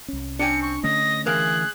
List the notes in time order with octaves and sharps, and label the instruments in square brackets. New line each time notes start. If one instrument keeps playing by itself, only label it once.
[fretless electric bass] C2 C#4
[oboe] C4 [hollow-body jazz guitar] D4 G5 G#5 [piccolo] C#7
[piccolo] C#6
[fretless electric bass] D3 A3 C#4 [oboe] D#5 [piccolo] A#6
[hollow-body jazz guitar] E3 A#4 F5 [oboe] G#4 [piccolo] F#6